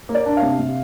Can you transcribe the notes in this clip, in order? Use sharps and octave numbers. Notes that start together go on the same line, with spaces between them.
A#3
D5
D4
F5
C3
C3